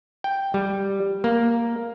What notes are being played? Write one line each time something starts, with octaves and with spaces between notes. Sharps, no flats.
G5
G3
A#3